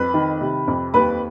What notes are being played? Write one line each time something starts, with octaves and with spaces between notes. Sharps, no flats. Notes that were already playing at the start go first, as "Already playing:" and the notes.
Already playing: F2 B4 B5
D#3
C3
F2
D#2 B4 B5